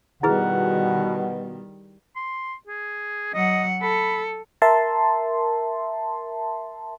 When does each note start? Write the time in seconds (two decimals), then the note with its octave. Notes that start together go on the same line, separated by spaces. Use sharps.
0.23 B2 D#3 G3 E4 G#4 B4 F#5
2.16 C6
2.67 G#4
3.34 F#3 D#5 F#5
3.82 A4 B5
4.62 A#4 E5 A5 C6